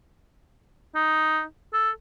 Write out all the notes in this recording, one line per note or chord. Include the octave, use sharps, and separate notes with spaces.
D#4
A4